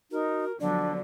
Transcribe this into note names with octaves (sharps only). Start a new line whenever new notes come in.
D#4 F#4 A#4
D3 F3 F#3 B3 D4 D5